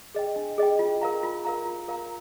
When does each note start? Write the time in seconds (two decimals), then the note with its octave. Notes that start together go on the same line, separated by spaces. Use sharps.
0.15 G#4 D#5 G5
0.36 D4
0.58 G#4 D#5 G5
0.79 F4
1.01 A#4 F5 A#5
1.23 F4
1.44 A#4 F5 A#5
1.65 F4
1.88 A#4 F5 A#5